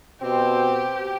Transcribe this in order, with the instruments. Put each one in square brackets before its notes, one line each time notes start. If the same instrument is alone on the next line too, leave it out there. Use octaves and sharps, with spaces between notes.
[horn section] B2 C4 [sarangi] G4